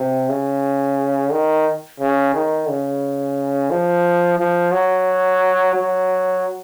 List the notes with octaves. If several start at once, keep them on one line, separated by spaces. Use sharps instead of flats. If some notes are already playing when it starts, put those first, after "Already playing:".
Already playing: C3
C#3
D#3
C#3
D#3
C#3
F3
F3
F#3
F#3